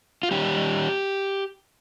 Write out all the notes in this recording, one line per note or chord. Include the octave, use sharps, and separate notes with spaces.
F4
D#3 G3 C#4 G4